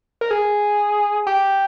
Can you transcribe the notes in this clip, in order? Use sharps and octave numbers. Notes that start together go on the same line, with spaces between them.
A#4
G#4
G4